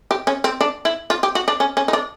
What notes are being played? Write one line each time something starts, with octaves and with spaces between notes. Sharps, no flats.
G4
C#4
C4
D4
E4
F4
G4
F#4
D4
C#4
C#4
D#4
D4